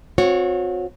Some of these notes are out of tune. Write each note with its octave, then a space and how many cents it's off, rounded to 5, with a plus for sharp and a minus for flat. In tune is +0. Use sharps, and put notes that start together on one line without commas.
C4 +0 F#4 -35 C#5 +0